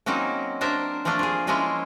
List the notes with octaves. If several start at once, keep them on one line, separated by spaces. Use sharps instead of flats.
F#3 A#3 C4 C#4 D#4
D4 A#4 C5 E5
F3 A3 A#3 D4 F4
F4 G#4
F3 G#3 A#3 C#4 E4 F4